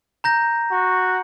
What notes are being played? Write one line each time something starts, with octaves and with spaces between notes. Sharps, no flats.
A#5 G6 A#6
F#4